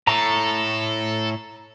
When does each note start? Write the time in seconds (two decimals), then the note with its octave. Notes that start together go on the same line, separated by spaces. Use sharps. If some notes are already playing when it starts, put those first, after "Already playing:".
0.07 A2 A4 A#5 C#6